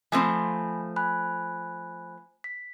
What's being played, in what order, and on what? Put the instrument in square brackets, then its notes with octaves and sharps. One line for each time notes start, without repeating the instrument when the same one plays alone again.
[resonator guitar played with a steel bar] F3 A3 C4 [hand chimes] G#5 B5
[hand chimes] G#5 B5 F#6
B6